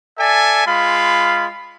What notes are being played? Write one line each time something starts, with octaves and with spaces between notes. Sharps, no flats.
A4 D5 E5 G#5
G#3 F4 F5 B5